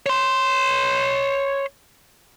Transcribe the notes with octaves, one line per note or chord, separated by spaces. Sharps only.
C#5 C6